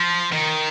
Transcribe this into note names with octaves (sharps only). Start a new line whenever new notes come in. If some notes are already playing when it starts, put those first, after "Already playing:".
Already playing: F3
D#3